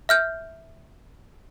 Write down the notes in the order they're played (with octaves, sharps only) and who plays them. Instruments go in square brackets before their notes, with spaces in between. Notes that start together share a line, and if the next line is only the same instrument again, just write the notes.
[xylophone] E5 F6 G6